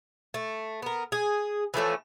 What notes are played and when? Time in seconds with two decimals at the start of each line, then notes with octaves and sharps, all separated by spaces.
0.34 A3
0.82 B3 A#4
1.12 G#4
1.74 E3 F3 A3 C#4